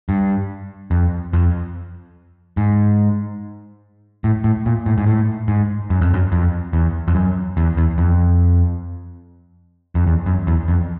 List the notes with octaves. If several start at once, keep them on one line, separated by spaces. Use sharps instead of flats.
G2
F2
F2
G#2
A2
A2
A#2
A2
G#2
A2
G#2
F#2
F2
F#2
F2
E2
F2
F#2
E2
E2
F2
F2
E2
F#2
E2
F2